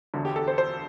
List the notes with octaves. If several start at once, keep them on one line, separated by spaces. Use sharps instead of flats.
E1 D2 D3
G4
A4
C5
C5